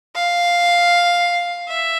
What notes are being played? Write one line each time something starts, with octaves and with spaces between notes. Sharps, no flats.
F5
E5